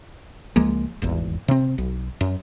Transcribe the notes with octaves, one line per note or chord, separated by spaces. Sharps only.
C#2 F3 G#3 A#3
D#1 G#1 E2
C3 C4
B1
F#2